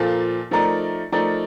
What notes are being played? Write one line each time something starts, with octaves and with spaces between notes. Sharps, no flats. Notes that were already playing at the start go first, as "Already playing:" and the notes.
Already playing: A#2 F3 A#3 F4 A4
F3 A3 D#4 A#4 D5
F3 A3 D#4 A#4 D5